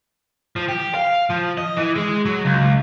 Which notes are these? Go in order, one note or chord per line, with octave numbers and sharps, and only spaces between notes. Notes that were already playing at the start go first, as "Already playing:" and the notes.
F3
G4
F5
F3
D#5
E3
G#3
F#3
C#2